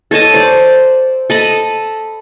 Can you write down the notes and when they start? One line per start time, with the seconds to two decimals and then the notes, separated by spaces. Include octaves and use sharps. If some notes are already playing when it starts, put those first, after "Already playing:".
0.11 A4 C#5 D#5 A5
0.34 C5 D5
1.30 A4 D#5 B5